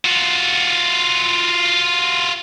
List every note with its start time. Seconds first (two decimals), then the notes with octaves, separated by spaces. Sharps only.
0.05 F4 F#4